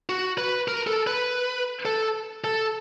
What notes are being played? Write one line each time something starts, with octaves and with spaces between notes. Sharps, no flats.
F#4
B4
A#4
A4
B4
A4
A4